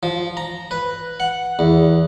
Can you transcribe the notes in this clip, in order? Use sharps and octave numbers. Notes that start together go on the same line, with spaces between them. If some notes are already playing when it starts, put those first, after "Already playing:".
F3
A#5
B4
F#5
E2